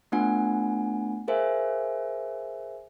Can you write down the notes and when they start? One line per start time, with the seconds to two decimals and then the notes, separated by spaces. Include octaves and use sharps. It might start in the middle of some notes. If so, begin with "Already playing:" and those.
0.12 A3 B3 D4 F4 F#5 G#5
1.28 G#4 A#4 C5 E5 F5 G#5